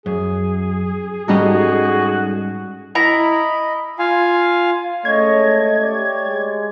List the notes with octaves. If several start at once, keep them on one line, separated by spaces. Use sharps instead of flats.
F#2 G#4
G#2 G3 C#4 D#4 F#4 A4 D#5
E4 D#5 A#5 B5
F4 F5 G#5
G#3 A3 C#4 C#5 D#5 G#6
G4 C#5 D5
G#3